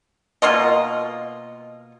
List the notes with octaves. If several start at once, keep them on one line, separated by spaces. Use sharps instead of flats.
B2 A#3 F4 D#5